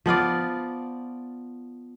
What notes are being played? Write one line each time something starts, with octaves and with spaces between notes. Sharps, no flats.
F3 B3 F4 D5